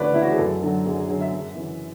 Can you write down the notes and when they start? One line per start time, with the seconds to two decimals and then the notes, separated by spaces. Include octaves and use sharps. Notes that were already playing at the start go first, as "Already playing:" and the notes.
Already playing: D2 C#3 E3 B4 C#5 D5
0.14 C#3 E3 E4
0.22 F#4
0.31 G#4
0.38 F#2 A4
0.62 D3 F#3 A4
0.86 F#2 G#4
0.96 G#4
1.08 D3 F#3 G#4
1.21 E5
1.32 F#2
1.55 C#3 E3